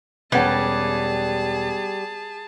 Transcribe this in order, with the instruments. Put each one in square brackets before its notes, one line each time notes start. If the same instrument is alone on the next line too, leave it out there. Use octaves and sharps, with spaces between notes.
[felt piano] E1 C#4 G#6 [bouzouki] G3 [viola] G#4 A5 [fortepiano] B4 F#5